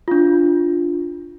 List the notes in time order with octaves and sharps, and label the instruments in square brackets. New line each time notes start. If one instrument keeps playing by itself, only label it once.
[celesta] D4 F4